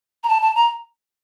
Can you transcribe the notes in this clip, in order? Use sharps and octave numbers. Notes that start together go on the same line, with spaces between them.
A#5
A5
A5
A#5